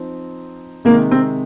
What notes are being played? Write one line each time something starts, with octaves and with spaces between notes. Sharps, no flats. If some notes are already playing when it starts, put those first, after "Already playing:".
Already playing: F3 C4 D#4
C3 D#3 G#3 A#3 D#4
C4